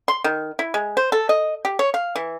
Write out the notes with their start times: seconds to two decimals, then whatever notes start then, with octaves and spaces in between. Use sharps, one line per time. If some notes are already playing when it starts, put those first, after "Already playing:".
0.08 C6
0.24 D#3
0.59 E4
0.74 G#3
0.97 C5
1.12 A4
1.29 D#5
1.65 G4
1.79 C#5
1.94 F5
2.16 E3